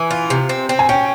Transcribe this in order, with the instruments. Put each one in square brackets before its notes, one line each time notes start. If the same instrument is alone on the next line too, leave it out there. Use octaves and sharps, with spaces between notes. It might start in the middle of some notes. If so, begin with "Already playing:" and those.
Already playing: [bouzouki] E3 [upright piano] G#5
[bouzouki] F4
C3
C4
C4
[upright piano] G#5
[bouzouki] C#4 [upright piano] G5